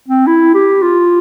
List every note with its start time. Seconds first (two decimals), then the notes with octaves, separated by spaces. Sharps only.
0.08 C4
0.27 E4
0.55 G4
0.83 F4